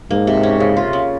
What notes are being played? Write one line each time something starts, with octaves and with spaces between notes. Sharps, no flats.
G#2 A#3
C3
C#4
C#3
F4
C#3